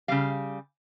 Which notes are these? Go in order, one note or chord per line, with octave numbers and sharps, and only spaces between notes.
C#3 G3 F5